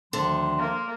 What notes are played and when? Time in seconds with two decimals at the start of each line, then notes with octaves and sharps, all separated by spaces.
0.13 D2 D3 D#3 F3 C6
0.59 A#3